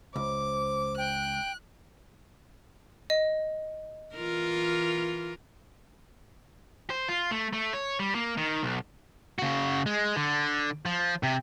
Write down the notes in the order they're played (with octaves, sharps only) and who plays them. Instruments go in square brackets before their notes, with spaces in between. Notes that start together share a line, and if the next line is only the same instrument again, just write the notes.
[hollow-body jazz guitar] C#2 [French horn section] C5 [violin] D6
[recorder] G5 [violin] F#6
[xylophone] D#5
[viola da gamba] E3 F4 A#4
[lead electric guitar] C5
F4
A3
A3
C#5
G3
A#3
D#3
B1
[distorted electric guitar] C#3 F#4
G#3
D3
F3
C3